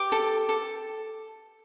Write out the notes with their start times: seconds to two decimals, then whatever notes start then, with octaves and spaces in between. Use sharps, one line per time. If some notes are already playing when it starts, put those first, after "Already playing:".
Already playing: G4 D6
0.12 A4
0.49 A4